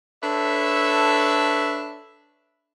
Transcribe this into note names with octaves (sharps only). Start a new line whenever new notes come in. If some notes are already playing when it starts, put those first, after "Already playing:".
D4 A4 B4 C#5 E5